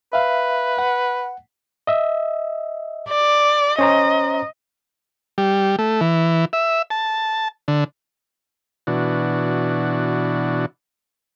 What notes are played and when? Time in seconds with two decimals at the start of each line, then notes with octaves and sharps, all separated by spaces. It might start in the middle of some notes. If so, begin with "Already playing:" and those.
0.13 B4 E5 F5
0.78 F#5
1.87 D#5 E5
3.09 D5
3.79 C#4 C5 D#5 A#5
5.38 G3
5.79 A3
6.01 E3
6.53 E5
6.90 A5
7.68 D3
8.87 B2 E3 D4 F#4